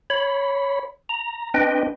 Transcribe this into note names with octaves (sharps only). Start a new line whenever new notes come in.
C#5 B5
A#5
C4 D4 B4 D#5 G5